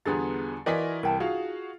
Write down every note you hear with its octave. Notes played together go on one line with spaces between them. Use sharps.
E2 D3 G3 B3 F4 G#4 A#5 A6
E3 F4 F#4 A#4 D5 D#5 G#5 B6
C2 A#4 G5 A5
D#4 F4 F#4 G#4 F5